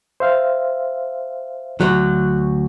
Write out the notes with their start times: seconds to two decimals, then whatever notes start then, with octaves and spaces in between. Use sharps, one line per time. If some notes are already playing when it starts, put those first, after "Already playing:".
0.20 C5 E5 F5
1.81 D2 F#3 F#6